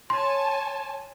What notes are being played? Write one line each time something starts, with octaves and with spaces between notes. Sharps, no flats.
C#5 G#5 A5 C6